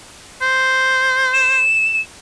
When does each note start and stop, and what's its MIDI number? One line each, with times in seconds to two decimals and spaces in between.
0.42 1.61 72
1.33 2.00 100